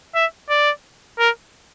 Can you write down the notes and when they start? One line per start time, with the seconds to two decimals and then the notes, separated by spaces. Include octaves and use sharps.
0.15 E5
0.50 D5
1.19 A#4